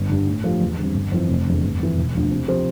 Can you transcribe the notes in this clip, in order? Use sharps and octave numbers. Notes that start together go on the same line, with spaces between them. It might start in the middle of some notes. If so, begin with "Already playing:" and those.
Already playing: G1
G2 D3
A2
F3 A3 D4 G4
E2
D3 G3 C4
G1
F2 E3
F1
E2 D3
G1
F2 E3
E1
D2 D3 F3
C3
F3 C4 G4 C5